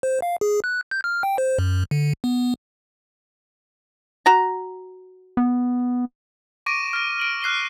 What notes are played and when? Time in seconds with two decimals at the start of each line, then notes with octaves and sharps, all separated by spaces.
0.03 C5
0.22 F5
0.41 G#4
0.64 F#6
0.91 G6
1.04 F6
1.23 G5
1.38 C5
1.59 F#2
1.91 D3
2.24 B3
4.26 F#4 A#5
5.37 B3
6.66 C#6 D6 A#6 D7 D#7
6.93 F6 A#6
7.20 D7 F#7
7.42 F6 F#6 C7 D7 G7